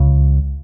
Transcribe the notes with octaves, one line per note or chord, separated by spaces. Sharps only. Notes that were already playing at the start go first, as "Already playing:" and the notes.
Already playing: C#2 C#3